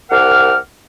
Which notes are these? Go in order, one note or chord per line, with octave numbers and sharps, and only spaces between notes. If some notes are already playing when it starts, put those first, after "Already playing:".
C2 A#4 F#5 D6 F6